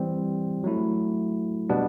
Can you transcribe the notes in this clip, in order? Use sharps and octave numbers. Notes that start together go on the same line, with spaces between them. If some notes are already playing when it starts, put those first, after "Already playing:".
Already playing: E3 G3 C4
F#3 A3 E4
B2 G3 B3 D4